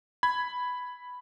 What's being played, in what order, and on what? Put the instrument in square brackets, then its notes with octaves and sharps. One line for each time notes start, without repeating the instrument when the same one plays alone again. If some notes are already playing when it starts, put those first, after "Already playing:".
[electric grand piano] B5 G#6